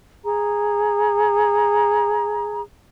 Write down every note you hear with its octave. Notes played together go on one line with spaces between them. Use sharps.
G#4 A#5